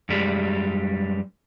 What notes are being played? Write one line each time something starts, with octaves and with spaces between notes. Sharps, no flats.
F#2 G3 G#3